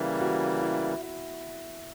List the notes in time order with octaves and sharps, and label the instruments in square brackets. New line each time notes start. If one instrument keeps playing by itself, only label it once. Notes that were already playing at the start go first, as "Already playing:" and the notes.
Already playing: [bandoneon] C#3 E3 G3 A#3 [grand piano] E5
[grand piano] F#4
E4
E4